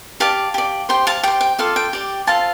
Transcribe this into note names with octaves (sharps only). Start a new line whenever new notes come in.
G4 D5 F5 A5
G4 D5
G4 C5 G5 C6
F5 A5
G4 C5 G5
G5
F4 A4 D5 F5
G5
G4 D5
F4 A4 C5 F5 A5